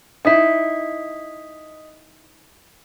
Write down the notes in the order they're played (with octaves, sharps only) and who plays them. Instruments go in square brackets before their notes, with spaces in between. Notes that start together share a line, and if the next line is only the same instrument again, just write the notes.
[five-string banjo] D#4 E4 [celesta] D#5 D#6 B6